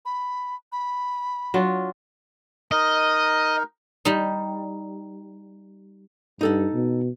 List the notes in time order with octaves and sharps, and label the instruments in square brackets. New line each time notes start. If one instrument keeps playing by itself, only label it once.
[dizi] B5
B5
[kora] F#3 D4 F4
[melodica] D#4 A#4 [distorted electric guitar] D#5
[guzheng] G3 D#4
[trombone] G2 [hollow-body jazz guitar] D#4 A4 F#5
[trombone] B2